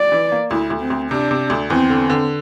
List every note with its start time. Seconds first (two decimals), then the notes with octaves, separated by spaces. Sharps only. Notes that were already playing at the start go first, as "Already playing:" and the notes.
Already playing: D5
0.12 E3
0.32 A#3
0.51 D2 E4
0.70 D2
0.81 C4
0.90 D2
1.10 C3 D4
1.31 C3
1.50 D2
1.70 E2 C4
1.90 D3
2.10 D3